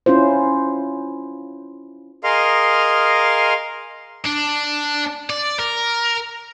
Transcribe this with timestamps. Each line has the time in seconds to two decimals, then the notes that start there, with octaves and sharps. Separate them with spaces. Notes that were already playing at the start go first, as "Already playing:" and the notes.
0.06 C#4 E4 F4 C5
2.24 G#4 A#4 D#5 F5 C6 F6
4.24 D4
5.30 D5
5.59 A#4